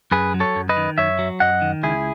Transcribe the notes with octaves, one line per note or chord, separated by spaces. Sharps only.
F#2 G#4 B4
F#3
A4 C#5
F#2
B4 D#5
D#3
F#2 C#5 E5
F#3
F#2 D#5 F#5
D#3
C#2 E4 G#4